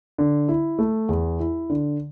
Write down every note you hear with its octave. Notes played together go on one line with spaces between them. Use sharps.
D3
E4
A3
E2
E4
D3